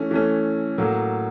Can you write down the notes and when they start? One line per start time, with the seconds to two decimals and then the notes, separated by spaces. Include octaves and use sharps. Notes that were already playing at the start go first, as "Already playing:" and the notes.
Already playing: E3 A3 C#4
0.11 E3 A3 C#4
0.78 A2 F#3 A#3